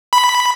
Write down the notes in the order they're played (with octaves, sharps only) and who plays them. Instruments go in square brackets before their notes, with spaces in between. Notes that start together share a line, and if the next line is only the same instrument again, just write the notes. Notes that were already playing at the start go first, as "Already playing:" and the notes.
[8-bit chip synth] B5